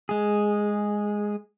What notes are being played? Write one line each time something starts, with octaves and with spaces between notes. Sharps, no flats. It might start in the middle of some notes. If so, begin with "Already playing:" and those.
G#3 G#4